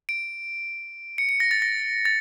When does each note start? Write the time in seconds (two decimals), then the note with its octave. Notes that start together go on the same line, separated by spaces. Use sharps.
0.09 D7
1.18 C#7
1.29 C#7
1.40 A#6
1.51 A6
1.62 A#6
2.05 A6